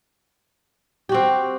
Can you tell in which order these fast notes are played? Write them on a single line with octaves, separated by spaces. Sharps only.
G4 F#4 C4